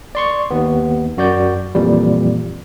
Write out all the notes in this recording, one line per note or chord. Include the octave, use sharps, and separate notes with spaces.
D5 C6 C#6
D#2 B3
F#2 F#4 D5 G6
F2 A#2 E3 G3